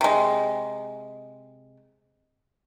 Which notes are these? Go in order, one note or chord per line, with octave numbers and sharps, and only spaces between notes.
C3 G#3